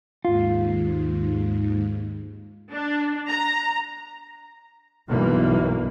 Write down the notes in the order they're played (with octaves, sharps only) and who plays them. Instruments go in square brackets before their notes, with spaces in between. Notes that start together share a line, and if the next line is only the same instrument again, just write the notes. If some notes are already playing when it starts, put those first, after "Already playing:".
[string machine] D#2 G#2 [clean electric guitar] F4
[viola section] D4
A#5
[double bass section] B1 G2 E3 A#3